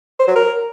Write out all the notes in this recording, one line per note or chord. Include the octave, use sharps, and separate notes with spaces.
C5
F#3
A#4